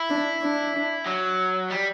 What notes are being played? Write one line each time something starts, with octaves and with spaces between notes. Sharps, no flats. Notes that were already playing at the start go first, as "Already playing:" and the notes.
Already playing: E4
D4
D4
F#3
G3